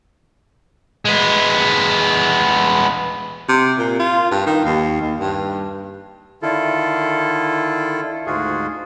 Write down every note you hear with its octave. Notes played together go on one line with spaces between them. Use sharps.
G#3 B3
C3
A#2
F4
G2
D#3
D#2
D#2
G2
D3 D#3 E4 F4 A4
D2 G#2 G#3 F4 F#4 G#4